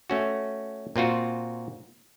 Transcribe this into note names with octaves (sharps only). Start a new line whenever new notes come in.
A3 C#4 F#4
A#2 C4 F4 F#4